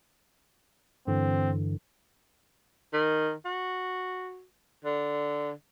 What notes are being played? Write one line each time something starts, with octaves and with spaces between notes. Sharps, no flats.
G2 D3 E3 C4
D#3
F#4
D3